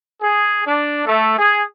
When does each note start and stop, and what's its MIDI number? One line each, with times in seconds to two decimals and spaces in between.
0.21 0.60 68
0.66 1.05 62
1.06 1.37 57
1.39 1.62 68